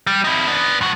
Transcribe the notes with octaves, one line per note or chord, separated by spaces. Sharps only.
G3
D#4 E4
B3 D4
G2 F#4